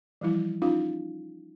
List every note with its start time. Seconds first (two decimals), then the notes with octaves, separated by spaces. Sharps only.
0.21 E3 F3 G3 E4
0.62 C#4 D#4 F4 F5